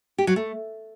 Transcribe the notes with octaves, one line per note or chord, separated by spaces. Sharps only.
G4
F#3
A3